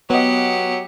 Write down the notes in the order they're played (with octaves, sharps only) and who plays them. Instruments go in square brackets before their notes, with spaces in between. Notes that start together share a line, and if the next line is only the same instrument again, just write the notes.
[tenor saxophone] F#3 [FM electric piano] B3 D#5 [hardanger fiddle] G4 F#5